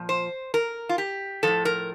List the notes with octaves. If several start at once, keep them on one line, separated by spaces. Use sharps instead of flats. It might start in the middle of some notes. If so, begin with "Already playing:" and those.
Already playing: A#2 F3
C5
A#4
F4
G4
A2 F3 A4
A#4